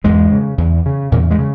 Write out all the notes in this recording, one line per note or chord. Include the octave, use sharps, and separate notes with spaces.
E2 G#2 G#3
C#3
E2
C#3
E2 A#2 A#3
G#3
C#3